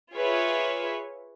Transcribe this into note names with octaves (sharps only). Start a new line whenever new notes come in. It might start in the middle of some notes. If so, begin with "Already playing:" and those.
F4 G#4 B4 C#5 E5